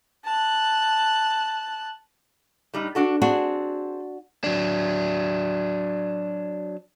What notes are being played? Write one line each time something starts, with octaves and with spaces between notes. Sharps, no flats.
A5 F#6
A2 G3 D#4
D4 F#4 A4
C4 D4 F#4 G#4
F#3 D4